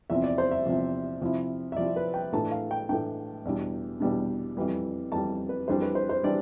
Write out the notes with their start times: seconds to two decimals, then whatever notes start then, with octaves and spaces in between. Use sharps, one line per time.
0.10 E2 C3 F3 C4 E5
0.24 D5
0.38 C5
0.51 E5
0.66 E2 C3 F3 C4
1.21 C3 F3 C4 E4
1.72 E5
1.77 C3 F3 C4 E4 D5
1.96 B4
2.14 G5
2.32 A2 E3 A3 D4 A5
2.52 F5
2.71 G5
2.89 A2 E3 A3 D4 G5
3.45 E2 B2 G3 D4
4.00 E2 B2 G3 D4
4.57 F2 E3 G3
5.12 F2 E3 G3 A5
5.49 B4
5.68 F2 E3 G3 D4 C5
5.82 B4
5.95 C5
6.09 C5
6.23 E3 G3 D4 D5